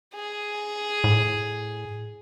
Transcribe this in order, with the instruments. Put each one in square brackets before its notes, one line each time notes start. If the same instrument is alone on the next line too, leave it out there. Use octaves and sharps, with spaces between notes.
[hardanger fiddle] G#4
[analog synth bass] A2